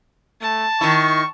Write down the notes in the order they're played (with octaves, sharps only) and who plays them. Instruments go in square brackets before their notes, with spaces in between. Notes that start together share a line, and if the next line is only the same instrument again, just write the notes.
[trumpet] A3 [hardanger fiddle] A5
[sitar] D#3 E4 [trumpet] C#6